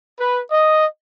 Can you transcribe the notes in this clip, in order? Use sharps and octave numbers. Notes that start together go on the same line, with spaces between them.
B4
D#5